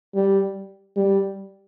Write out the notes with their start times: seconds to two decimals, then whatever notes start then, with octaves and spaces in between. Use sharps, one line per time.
0.15 G3
0.96 G3